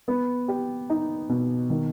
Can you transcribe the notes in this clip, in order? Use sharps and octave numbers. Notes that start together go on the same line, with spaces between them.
B3
G4
D#4
B2
D#3